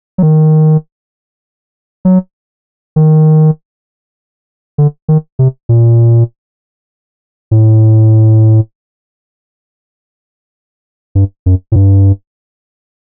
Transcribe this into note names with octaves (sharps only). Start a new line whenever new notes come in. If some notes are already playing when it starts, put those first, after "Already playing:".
F#3
D#3
F#3
D#3
D3
D#3
C3
A#2
A2
G2
F#2
A2
G2